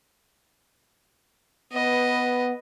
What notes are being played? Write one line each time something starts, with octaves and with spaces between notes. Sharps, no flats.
B3 B4 D#5